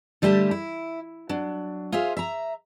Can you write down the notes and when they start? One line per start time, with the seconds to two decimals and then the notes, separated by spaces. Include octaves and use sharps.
0.22 D3 G3 A3 G4 G#5 A5
0.51 E4
1.29 F#3 D4
1.92 F4 G#4 C5 E5 F5
2.17 E5 A#5